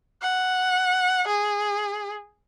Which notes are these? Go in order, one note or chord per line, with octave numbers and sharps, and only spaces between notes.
F#5
G#4